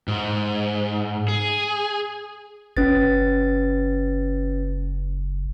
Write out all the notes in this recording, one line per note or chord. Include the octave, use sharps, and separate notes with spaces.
G#2
G#4
F#1 C#4 B4 A6